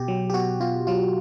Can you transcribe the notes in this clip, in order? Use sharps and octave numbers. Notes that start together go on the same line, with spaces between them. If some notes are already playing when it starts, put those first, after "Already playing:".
Already playing: B2 G4
F#3
G4
B2 F#4
B2 F4
F#3 F4